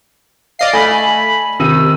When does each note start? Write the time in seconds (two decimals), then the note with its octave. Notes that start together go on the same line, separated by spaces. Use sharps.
0.59 D5 D#5 F5 C7
0.74 A3 G#5 B5
1.60 C3 D#3 E6 D#7